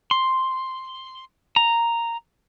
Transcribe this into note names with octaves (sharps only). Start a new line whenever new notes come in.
C6
A#5